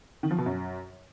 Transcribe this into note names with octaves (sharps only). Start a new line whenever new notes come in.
D#3
F3
B2
F#2